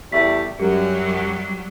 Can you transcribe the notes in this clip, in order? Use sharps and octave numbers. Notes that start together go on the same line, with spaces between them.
E2 G3 A3 E5 B6
F#2 F#3 G3 G4